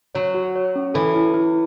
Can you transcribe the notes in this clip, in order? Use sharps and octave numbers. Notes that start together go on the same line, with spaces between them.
F#3 C#5
F#4
C#5
C#4
E3 A4
E4
E4